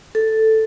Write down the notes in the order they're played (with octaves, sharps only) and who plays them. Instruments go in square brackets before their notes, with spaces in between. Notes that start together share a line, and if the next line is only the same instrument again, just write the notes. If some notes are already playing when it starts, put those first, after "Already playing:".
[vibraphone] A4